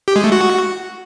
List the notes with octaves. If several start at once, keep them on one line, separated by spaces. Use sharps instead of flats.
G4
G#3
A3
F#4